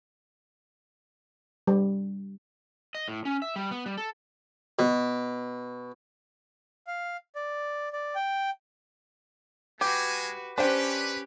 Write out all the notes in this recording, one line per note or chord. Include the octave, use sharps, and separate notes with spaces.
G3
D#5
A2
C#4
E5
G3
B3
G3
A4
B2
F5
D5
D5
G5
G#3 F#4 G4 B4 G#5
C#4 D4 G4 B4 C5 G5